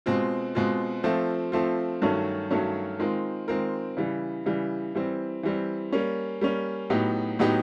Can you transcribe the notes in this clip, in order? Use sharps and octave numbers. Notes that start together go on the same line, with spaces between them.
B2 G#3 C4 F4
B2 G#3 C4 F4
F3 A3 C4 F4
F3 A3 C4 F4
G2 D#3 F#3 A3 C#4
G2 D#3 F#3 A3 C#4
D#3 G#3 C4 F4 A#4
D#3 G#3 C4 F4 A#4
C#3 E3 G3
C#3 E3 G3
E3 G3 C4
E3 G3 C4
G3 A#3 C#4
G3 A#3 C#4
A2 F#3 B3 D#4 G4
A2 F#3 B3 D#4 G4